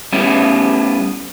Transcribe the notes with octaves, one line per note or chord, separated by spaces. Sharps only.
G3 A3 B3 C#4